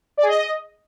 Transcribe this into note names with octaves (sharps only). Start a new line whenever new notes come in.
D5
G#4
D#5